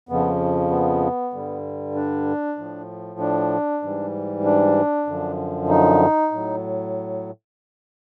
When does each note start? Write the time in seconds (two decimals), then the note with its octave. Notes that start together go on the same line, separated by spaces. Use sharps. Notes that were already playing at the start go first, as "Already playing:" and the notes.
0.09 F2 C#3 F3 B3
0.71 B3
1.33 G2 D3 G3
1.95 D4
2.58 A2 F3
3.20 D4
3.82 G#2 E3 G3
4.45 D4
5.07 F#2 D3 F3
5.69 D#4
6.32 A2 F#3